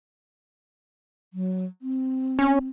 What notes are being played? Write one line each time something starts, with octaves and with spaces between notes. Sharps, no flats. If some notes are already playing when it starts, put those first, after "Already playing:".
F#3
C4
C#4